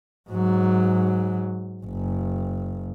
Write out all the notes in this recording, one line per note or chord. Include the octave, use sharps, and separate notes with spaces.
G#2 F#3
F#1